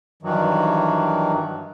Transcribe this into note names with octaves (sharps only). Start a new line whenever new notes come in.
G2 D#3 E3 F#3